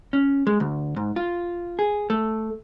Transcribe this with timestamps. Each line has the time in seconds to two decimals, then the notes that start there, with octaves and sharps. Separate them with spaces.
0.13 C#4
0.47 G#3
0.60 D2
0.96 G#2
1.16 F4
1.79 G#4
2.10 A3